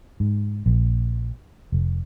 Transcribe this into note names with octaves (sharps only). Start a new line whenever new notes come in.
G#2
A#1
F1